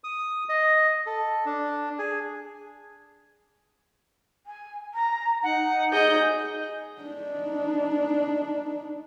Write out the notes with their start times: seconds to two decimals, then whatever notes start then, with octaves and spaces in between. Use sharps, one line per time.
0.04 D#6
0.49 D#5
1.06 A4
1.46 D4
1.99 G#4
4.46 G#5
4.94 A#5
5.43 D#4 F#5
5.91 G#4 D#5 G6
7.02 D4 D#4